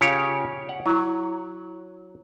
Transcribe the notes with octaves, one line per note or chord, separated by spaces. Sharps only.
C#3 F4 G4 C#5 F5
C#5 F#5
F#3 E4 A#5